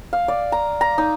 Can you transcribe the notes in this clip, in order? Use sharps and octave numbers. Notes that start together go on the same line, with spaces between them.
F5
D5
A#5
A#5
D#4